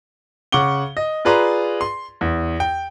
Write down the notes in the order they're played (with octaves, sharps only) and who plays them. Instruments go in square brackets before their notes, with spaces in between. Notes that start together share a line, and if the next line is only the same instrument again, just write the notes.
[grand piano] C#3 F#5 C#6 D6 G7
D#5
F4 G#4 B4 D5 A#5 C6
C6
E2
G5